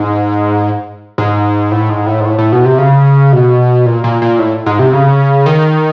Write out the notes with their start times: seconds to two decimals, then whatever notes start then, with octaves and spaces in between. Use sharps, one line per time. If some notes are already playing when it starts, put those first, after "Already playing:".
Already playing: G#2
1.18 G#2
1.71 A2
1.89 G#2
2.06 A2
2.20 G#2
2.25 A2
2.38 A2
2.52 B2
2.65 C3
2.78 C#3
3.32 B2
3.86 A#2
4.04 A#2
4.22 A#2
4.39 A2
4.66 G#2
4.79 C3
4.93 C#3
5.46 D#3